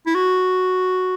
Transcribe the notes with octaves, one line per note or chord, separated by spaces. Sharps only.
E4
F#4